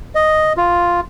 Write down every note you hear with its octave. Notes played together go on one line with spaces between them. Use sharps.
D#5
F4